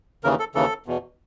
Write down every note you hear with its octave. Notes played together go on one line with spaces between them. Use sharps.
D#2 C#3 E3 A#4
A4
D#2 C#3 E3 A4
E2 B2